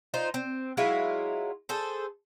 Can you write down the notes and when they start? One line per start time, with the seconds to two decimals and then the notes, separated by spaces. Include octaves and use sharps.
0.14 D#4 F4 C5
0.34 C4
0.77 F#3 G#3 E4 F4
1.69 G#4 A4 C5